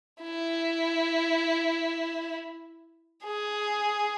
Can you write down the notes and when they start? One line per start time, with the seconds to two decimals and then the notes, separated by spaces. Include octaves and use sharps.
0.23 E4
3.25 G#4